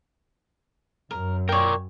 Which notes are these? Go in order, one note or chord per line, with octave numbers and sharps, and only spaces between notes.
F#2 A#4
A#4 C#5 D5 G5